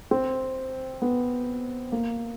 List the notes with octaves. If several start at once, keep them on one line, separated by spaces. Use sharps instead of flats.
C4
B3
A#3